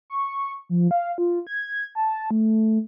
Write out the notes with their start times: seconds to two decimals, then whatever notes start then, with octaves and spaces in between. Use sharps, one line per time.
0.10 C#6
0.69 F3
0.91 F5
1.18 F4
1.47 G#6
1.95 A5
2.31 A3